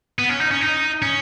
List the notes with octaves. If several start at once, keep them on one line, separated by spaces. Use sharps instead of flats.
B3
C#4
D#4
C#4
D#4
C#4